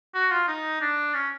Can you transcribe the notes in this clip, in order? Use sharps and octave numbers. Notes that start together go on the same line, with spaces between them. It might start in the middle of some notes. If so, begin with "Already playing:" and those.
F#4
F4
D#4
D4
C#4